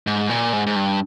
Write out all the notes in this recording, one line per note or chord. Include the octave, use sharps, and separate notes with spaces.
G#2
A#2
G#2
G#2
G2